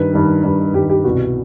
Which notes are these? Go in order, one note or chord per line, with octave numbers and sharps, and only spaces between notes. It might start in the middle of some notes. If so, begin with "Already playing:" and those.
Already playing: G2 D#3 B4
G2 D#3
G2 D#3
G2 D#3 G4
G4
C2 B2 F#4